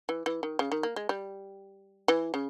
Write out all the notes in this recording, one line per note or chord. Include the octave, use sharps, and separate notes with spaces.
E3
E3
D#3
C#3
D#3
A#3
G#3
G3
E3
C#3